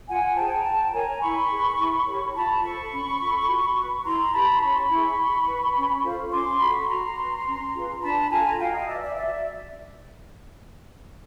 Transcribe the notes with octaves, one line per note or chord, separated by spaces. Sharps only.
F4 F#5 G#5
G#4 C5 G5 A5
A#5
F4 G5 A5
A#4 C#5 G#5 A#5
E4 B5 C#6
G#4 B4
E4
G4 A#4 C#5
F4 A5 B5
A4 C5 B5 C#6
C#4
F4 A4
F#4
B4
E4 A#5 C6
G4 B4 A5 B5
C6
C#4 B5 C#6
E4
G#4
F#4
B4
C#4
F4 A4 C5
C#4 C6 D6
F#4 A4 B5 C#6
F#4 A#5 C6
B4
C#4
F4 G#4 B4
D4 A5 B5
F4 A4 G#5 A#5
F#4 F5 G5
D#5 F5
B4 D5 E5
D5 E5
F#4 D5 E5